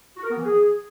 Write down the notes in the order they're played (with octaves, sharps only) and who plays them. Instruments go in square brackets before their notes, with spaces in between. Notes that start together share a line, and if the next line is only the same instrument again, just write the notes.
[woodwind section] F#4
A#4
B3
E3
G#4